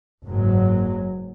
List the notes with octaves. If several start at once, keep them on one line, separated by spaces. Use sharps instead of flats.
F#1 G#2 F#3